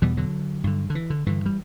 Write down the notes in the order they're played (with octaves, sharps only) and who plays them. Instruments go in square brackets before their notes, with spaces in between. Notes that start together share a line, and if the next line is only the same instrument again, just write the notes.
[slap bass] E2 B2 E3 G3
D3 F#3
G2 D3
D3
E3
D3
G2 D3 E3
G3